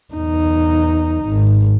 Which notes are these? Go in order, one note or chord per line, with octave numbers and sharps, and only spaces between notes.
E2 D#4
G#1